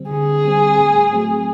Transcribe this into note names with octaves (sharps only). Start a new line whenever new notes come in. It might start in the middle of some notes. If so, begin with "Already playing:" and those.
Already playing: D3 G3 C4
D3 G#4
G3 C4
A2
F#3 A3 C4